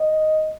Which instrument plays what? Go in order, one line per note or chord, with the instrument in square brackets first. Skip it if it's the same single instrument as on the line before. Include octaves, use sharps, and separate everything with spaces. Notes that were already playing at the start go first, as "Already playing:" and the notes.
Already playing: [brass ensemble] D#5